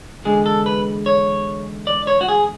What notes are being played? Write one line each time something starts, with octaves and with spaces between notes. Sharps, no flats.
E2 D3 G#3 G#4
A4
B4
C#5
D5
C#5
F#4
G#4